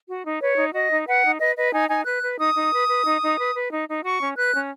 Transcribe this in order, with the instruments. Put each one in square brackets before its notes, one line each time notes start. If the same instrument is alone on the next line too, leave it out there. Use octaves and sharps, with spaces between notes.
[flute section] F#4
D#4
B4 C#5
D#4
F#4 D#5
D#4
B4 F#5
D#4
B4 D#5
B4 D#5
D#4 G#5
D#4 G#5
B4 F#6
B4
D#4 D#6
D#4
B4
B4
D#4
D#4
B4
B4
D#4
D#4
F#4 C#6
C#4
B4 F#6
C#4